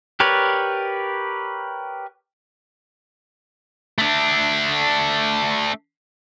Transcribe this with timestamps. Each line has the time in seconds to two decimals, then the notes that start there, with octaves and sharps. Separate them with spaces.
0.20 G4 A#4 B4 C#5 D5
3.98 A3 D4